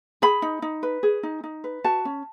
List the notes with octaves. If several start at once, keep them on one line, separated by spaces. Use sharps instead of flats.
G#4 B5
D#4
D#4
B4
G#4
D#4
D#4
B4
F#4 A5
C#4